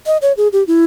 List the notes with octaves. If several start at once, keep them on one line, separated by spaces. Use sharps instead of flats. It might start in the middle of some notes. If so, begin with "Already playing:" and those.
D#5
C#5
G#4
G4
E4